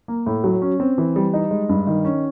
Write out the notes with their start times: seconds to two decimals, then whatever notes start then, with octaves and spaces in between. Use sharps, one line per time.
0.08 A#3
0.26 A2
0.44 F#3
0.62 C#4
0.80 C4
0.98 E3
1.16 G3
1.34 D#4
1.51 G#3
1.69 G2
1.87 D#3
2.05 C#4